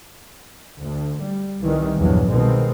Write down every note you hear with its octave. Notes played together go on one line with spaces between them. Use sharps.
D2
G3
C2 D#3 E3 G3
A#1 E2 G2 F#3
C2 B2 D#3 G#3 C4